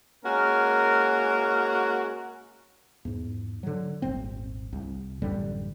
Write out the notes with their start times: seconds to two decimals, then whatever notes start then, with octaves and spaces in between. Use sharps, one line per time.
0.25 G#3 A#3 C#4 F#4 A#4
3.05 E2 G#2
3.63 D3 F#3
4.02 D#1 G#1 C4
4.73 C2
5.22 A1 F#2 D3 G3